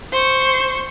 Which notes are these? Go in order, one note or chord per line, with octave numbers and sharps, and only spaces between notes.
C5 C#6